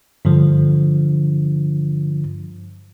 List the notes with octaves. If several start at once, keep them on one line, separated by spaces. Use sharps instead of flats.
G2 D3 F3